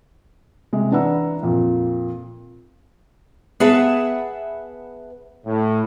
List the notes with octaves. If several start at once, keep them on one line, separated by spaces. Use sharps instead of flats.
C3 G#3
E3 D4 B4 F#5 A#5 E6
F2 A#2
B3 G#4 B4 E5 F#5 A5
A2